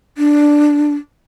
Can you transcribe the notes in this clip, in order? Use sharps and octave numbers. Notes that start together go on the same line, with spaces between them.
D4